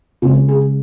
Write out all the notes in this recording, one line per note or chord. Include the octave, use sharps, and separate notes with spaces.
C#3 G#3 F4
G#4